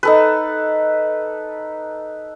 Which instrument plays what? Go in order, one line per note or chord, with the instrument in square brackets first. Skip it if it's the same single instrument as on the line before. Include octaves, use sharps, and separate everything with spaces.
[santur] D#4 A4 B4